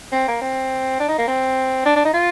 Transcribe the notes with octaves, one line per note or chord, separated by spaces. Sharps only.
C4
A#3
C4
D4
D#4
A#3
C4
D4
D4
D#4
F4